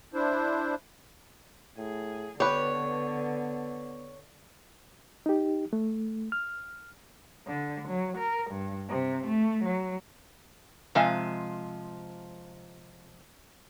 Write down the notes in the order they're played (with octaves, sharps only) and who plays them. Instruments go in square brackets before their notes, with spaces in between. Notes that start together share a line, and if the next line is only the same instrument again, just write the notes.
[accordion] D4 E4 C5
[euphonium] A2 [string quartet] G#4
[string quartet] D3 [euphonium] B3 [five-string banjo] G4 B4 [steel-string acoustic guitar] C#5
[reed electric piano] D#4 G4
A3
F6
[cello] D3
F#3
A#4
G2
C3
A3
F#3
[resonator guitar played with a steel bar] C3 F3 G#3 F5 G#5